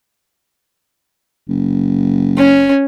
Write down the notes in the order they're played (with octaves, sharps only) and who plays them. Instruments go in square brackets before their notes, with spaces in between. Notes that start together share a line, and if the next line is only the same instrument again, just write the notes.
[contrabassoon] F#1
[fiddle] C#4